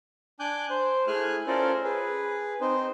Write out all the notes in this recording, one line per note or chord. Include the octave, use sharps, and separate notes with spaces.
D4 G#5 D6 F#6 G6
C5
A3 E4 G#4 G#5 F6 F#6
C#4 F4 A4 A#4 C5 D5
G#4 B4
C4 D#4 C5